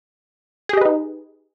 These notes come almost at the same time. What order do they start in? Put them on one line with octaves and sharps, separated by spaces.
G#4 G4 D#5 B4 D#4